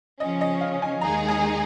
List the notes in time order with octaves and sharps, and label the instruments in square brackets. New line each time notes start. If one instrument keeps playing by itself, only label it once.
[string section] C#3 F3 C#4 [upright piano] D#5
[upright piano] D#5
F5
G#5
[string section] D#2 D#3 G#3 D#4 G#4 [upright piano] A#5
[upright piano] G#5